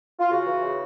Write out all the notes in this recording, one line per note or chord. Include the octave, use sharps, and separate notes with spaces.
F4
C#3 F#4
E3
C#3